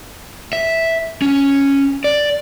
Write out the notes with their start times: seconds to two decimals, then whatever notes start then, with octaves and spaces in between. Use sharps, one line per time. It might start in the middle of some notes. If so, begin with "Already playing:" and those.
0.53 E5
1.22 C#4
2.04 D5